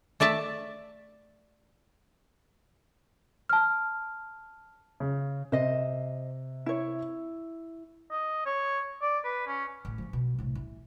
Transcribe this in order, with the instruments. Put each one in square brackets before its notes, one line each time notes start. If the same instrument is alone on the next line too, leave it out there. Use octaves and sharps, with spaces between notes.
[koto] A3 D5 E5 A5
[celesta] A5 F6
[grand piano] C#3
[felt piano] C3 [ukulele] C5 D#5
[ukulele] E4 C#5
[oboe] D#5
C#5
D5
B4
C#4
[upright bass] A1
F3 C4
B2
C2 A2
E3